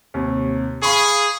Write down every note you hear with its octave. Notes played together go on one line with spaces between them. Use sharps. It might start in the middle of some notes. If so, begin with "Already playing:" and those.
D#2 C3
G#4 F5 B5 C#6